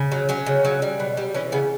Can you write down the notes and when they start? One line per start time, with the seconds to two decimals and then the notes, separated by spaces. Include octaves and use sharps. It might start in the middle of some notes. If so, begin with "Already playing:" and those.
Already playing: C#3
0.12 F#3
0.29 F#3 C#4
0.46 C#3
0.65 F#3
0.82 G3
1.00 B2
1.17 G3
1.34 E3 C#4
1.52 C#3 B3